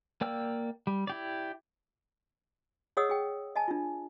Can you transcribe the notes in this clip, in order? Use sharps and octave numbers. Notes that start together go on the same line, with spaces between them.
A#3 D5 G5 E6
G3
E4 G4 D5
G#4 C#5 D#5 F#5 D#6 E6
G#4 G5
D#5 G#5 A5
D4 F4